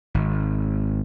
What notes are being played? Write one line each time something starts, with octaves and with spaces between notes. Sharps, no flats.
G#1